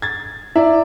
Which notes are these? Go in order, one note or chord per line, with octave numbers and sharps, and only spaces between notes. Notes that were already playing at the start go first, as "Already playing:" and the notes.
G#6 A6
E4 D5 E5